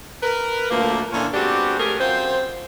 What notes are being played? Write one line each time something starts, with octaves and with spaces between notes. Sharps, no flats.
A#4 B4
D2 F3 A3 A#3
A#2 D3 E3 C#4 D4 F4
G#3 B3 C4 D4 F#4 G4
A3 C#4 G4 G#4 A#4
F#2 C4 F4 C5